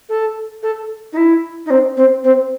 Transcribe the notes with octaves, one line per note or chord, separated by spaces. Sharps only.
A4
A4
D#4
E4
D#4
C4
C4
C4